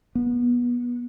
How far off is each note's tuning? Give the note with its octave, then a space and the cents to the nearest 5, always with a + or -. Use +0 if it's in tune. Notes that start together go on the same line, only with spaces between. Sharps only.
B3 -25